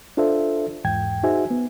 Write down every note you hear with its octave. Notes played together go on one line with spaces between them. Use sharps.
D4 F4 A4 C5 E5
E2 G#2 G5 G#6
D#4 F#4 G#4 C5 E5 G#5
B3